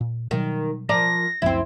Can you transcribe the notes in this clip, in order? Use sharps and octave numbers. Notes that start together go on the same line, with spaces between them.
A#2
B2 D#3 F#3 G3
F3 A#4 D5 A#6
C#2 F#2 F3 C4 E4